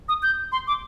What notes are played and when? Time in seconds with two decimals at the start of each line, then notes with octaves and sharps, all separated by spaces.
0.09 D#6
0.23 G6
0.52 C6
0.67 D6